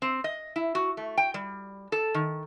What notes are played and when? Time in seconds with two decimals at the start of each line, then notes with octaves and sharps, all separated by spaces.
0.02 C4
0.24 D#5
0.56 E4
0.75 F#4
0.97 A3
1.17 G5
1.34 G3
1.92 A4
2.14 D#3